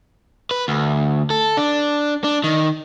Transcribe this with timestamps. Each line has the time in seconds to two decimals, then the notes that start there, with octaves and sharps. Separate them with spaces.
0.51 B4
0.68 D2
1.30 A4
1.57 D4
2.24 D4
2.44 D#3